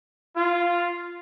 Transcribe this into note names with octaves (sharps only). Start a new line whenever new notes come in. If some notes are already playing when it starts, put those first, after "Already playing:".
F4